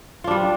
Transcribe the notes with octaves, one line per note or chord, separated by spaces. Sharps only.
G3 D4 F4